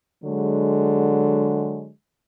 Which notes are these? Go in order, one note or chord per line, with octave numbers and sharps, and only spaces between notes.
D3 F#3 G#3